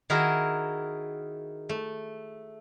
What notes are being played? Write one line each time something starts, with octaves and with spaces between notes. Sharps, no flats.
D#3 E4 F#4 G#4 A#4
A3